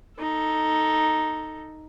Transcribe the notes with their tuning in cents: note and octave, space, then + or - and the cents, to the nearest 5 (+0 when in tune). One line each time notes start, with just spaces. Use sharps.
D#4 +0 A4 +10